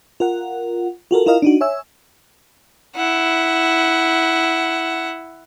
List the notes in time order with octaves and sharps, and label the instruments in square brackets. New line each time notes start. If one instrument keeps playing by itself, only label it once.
[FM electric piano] F4 A#4 F#5
F4 F#4 A4 A#4
E4 F4 A#4 D#5 F5
D4 D#4 F#4
C#5 E5 G#5 E6
[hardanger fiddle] E4 F#5